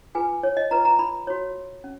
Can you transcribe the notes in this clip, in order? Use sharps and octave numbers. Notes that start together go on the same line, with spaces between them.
F4 G#4 B4 G#5
C#5
D#5
F4 B4 A#5
A#5
B5
F#4 C#5
C#4